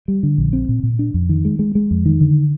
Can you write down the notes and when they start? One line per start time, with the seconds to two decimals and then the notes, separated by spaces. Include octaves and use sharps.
0.08 G3
0.23 D3
0.38 A#1
0.53 C4
0.69 A#2
0.83 A#2
0.99 D4
1.14 F2
1.29 D#3
1.45 G#3
1.59 G#3
1.75 G#3
1.91 F2
2.06 D#3
2.20 D3